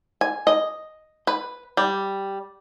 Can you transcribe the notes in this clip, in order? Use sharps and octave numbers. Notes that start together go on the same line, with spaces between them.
G#5
D#5
B4
G3